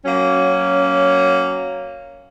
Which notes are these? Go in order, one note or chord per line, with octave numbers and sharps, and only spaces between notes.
F#3 A#3 C#4